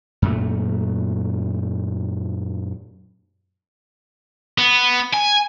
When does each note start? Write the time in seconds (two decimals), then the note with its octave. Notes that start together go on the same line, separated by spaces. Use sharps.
0.22 F#2 A#2 A3
4.58 B3
5.14 G#5